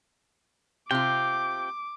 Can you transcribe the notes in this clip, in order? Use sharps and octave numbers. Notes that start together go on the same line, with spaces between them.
C3 F4 G5 D6